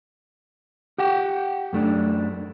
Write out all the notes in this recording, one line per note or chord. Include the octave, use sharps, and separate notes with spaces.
G4 F#5 G5
F#2 A3 D4